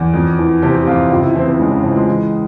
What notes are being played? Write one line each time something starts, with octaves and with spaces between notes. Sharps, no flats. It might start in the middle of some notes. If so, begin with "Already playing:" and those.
Already playing: E2
F2
E3
C3 G4
G4
F2 F4
C#2 F4
E4
E3 C4
C4
C#3 G#3
E3
C#2 F3
G#3
E3